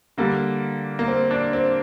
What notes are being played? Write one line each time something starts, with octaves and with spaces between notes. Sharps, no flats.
D3 G3 A#3
A#3
C4
D4
C4